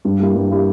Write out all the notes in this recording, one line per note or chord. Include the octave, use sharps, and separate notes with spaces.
G2
G3 A#3 E4 G4
G2
G3 A#3 E4 G4